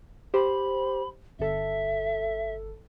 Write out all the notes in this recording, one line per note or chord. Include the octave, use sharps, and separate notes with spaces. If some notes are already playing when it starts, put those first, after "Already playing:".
G4 C5 B5
G1 A4 E5